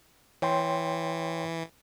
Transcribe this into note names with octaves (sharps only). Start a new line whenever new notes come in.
E3 C#5 G5 C6